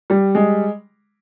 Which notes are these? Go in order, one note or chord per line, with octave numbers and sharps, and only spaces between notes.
G3
G#3